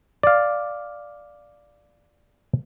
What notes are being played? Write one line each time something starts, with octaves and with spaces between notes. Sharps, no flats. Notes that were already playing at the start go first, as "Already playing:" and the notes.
D5 F5